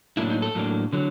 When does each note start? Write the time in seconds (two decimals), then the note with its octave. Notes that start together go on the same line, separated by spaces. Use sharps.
0.17 A2 F#3 A#3 D4 E4
0.30 D#4
0.42 A4
0.55 A2 F#3 A#3 D4
0.93 D3 F#3